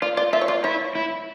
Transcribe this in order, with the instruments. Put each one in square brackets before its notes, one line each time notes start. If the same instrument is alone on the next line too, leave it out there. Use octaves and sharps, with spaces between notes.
[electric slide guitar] F4 [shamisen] D5
[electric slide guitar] F4 [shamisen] D5
[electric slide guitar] F4 [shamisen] E5
[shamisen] C#5
[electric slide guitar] F4 [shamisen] D5
[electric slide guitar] E4 [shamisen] C#5
[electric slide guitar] E4